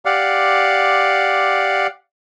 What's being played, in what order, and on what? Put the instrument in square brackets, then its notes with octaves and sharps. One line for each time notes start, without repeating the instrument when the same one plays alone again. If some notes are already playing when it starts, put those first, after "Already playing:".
[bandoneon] G4 D5 F5 F#5